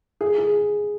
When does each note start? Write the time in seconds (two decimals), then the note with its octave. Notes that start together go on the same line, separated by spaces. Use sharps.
0.21 G#4
0.38 G#4